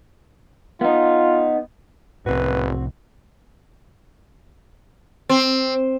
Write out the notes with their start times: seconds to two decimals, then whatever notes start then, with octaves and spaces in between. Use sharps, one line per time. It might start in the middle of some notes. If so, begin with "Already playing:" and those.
0.81 B3 D#4 F4
2.26 F#1 C2 A2 C4 F#4 B4
5.29 C4